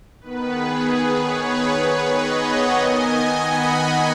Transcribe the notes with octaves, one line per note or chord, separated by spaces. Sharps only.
D#3 B3 B4
G#4
B4
G#4 C#5
B4
B4
B4 D#5
C#5 F#5
D#3 B3 D#5 G#5
F#5 B5